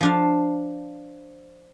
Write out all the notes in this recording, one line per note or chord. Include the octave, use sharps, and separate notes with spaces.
F3 D4 F5